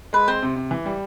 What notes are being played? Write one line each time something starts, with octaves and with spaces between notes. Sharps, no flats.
G#3 B4
C4 C5
C3
C3
E3
G3